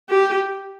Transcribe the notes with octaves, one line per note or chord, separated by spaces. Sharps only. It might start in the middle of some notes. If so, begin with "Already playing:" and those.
G4